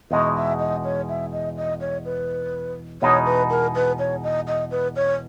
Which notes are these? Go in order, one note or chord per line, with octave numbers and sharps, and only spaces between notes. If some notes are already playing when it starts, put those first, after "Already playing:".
E2 B2 G#3 D#4 D#5
E5
D#5
C#5
E5
D#5
D#5
C#5
B4
E2 B2 G#3 D#4 C#5
B4
A#4
B4
C#5
D#5
D#5
B4
C#5